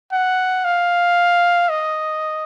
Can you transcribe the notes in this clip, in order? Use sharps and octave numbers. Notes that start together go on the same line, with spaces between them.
F#5
F5
D#5